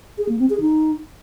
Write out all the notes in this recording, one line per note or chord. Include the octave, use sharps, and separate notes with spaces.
G#4
A#3
C4
G#4
D#4